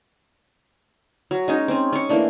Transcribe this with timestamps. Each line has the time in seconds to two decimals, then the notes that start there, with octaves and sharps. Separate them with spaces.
1.31 F#3
1.48 G#3 C#4 D#4
1.68 C4 C#4
1.93 C#4 C#6
2.09 E3 A3 A#3 D4